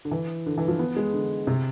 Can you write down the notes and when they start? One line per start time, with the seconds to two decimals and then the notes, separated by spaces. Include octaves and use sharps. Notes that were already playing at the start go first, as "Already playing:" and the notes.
0.05 D3
0.11 E3
0.46 D3
0.58 E3
0.68 F3
0.79 B3
0.96 G#3
1.13 D3
1.47 C3